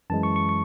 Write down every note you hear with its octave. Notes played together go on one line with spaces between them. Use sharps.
F#2 E3 G#3 A5
C#6
C#6
C#6